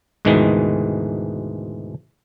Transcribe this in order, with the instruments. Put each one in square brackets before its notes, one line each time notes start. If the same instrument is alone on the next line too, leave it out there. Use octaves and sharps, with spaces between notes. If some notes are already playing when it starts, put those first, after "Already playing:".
[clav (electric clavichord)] D2 G#2 B2 D#3 E3 G#3